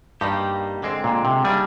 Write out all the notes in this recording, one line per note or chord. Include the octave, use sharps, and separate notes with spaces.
G2 G3 A#3 D#4 G4
D3 G#3 C4
A#2
C3
D#3 G3 A#3 D4 G#4